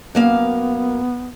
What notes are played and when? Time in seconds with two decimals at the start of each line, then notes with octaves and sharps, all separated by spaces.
0.15 F#2 A#3 B3 F5